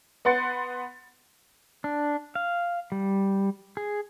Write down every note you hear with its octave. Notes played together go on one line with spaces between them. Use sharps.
B3 B4 F#5 C6 A6 C#7
D4
F5
G3
G#4